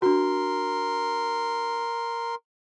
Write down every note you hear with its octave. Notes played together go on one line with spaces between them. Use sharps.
D4 F#4 A#4 C6